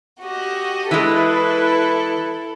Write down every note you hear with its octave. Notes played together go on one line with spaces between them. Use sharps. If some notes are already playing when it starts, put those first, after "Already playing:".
F#4 G4 D#5
E3 G#3 E4 A4 B4